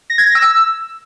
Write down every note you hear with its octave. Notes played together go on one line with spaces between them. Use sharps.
A#6
G#6
A#6
E6